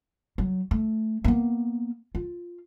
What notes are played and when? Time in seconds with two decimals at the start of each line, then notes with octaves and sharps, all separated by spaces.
0.38 F#3
0.71 A3
1.24 A#3 B3
2.15 F4